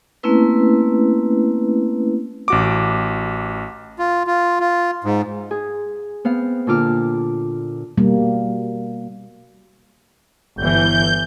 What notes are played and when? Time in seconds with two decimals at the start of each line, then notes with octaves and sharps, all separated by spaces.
0.23 A3 A#3 C4 C#4 E4 B4
2.48 A1 F#4 D6
3.99 F4
4.27 F4
4.60 F4
5.04 G#2
5.51 G#4
6.25 B3 C4 F5
6.67 A#2 D3 D4 F4 D6 F6
7.97 B2 G3 A#3
10.58 G1 E3 G6